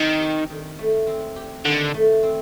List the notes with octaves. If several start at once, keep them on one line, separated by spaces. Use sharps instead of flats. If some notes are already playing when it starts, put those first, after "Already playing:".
Already playing: D#3 C4
G4
D#3
A3
C4
G4
D3 D#3
A3
C4